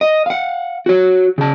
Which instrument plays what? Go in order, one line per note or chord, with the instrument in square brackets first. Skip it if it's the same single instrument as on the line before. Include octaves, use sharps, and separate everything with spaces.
[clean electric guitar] D#5
F5 F#5
F#4 C#5
C#3 A5